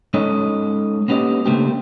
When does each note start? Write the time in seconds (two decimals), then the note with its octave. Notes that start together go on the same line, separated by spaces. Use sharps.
0.14 G#3 C#4 D#4 A4 C#5 D#5
1.08 A#3 B3 C#4 G4 D#5
1.46 C#3 A3 A#3 C4 D4 G4